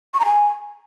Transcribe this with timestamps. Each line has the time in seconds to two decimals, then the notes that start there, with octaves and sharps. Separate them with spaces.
0.14 C#6
0.20 A#5
0.26 G#5